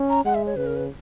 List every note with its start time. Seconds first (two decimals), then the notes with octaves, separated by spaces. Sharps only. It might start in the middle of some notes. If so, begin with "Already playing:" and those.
Already playing: C#4
0.10 A#5
0.25 G#3 F#5
0.35 E5
0.46 C#5
0.56 C#3 B4
0.66 A#4
0.76 B4